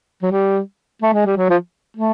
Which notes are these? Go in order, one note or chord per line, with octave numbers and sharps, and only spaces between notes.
F#3
G3
A3
G#3
G3
F#3
F3
A3